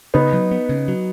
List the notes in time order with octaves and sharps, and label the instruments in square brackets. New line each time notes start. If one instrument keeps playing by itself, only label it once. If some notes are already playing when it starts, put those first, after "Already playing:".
[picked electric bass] C#3 [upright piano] B3 D#4
[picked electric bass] F#3
B3
C#3
F#3